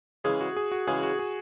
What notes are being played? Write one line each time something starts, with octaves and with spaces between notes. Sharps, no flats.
C#3 E3 G#3 G#4
F#4
G#4
F#4
C#3 E3 G#3 G#4
F#4
G#4